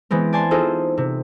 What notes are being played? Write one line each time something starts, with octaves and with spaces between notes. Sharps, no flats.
E3 G#3 B3 C4
D5 G#5 A5 C6
C4 D#4 F4 G#4 A4 C5
C3